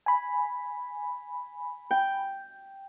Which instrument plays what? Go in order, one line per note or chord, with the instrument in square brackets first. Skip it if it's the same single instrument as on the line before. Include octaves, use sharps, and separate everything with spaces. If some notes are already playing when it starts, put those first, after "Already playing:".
[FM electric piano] G#5 B5
[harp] G5